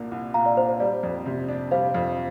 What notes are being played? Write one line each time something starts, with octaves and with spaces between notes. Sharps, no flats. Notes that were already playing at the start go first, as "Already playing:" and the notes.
Already playing: C2 A#2 A#3 D4
C2
A#2 F5 A#5
D5
D4 C5
C5
G3 D5
F2
C3
D4
G3 C5 F5
F2